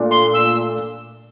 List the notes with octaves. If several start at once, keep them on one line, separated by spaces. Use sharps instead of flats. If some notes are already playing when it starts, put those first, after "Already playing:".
Already playing: A#2 A3 D4 F4
C6
E6